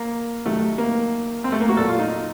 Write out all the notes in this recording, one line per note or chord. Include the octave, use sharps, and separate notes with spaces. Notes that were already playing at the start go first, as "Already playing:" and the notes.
Already playing: A#3
C3 D#3 F#3 A3
A#3
C4
A3
A#3
F#4
A#2 F#3 A4
F4
D#4